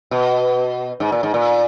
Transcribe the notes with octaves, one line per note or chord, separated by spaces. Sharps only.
B2
G#2
A#2
G#2
A#2